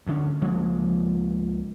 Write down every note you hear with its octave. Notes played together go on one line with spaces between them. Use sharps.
D2 D3 C#4
C#2 F3 G#3 A#3